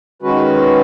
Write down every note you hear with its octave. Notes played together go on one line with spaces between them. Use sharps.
D#3 G#3 C#4 F#4 B4